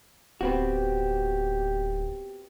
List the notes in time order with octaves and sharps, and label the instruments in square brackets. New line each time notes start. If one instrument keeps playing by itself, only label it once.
[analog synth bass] D1 [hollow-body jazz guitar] B3 C4 F#4 [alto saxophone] G4